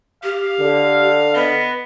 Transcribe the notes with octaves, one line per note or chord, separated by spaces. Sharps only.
G4 F5
D3
B3 D#5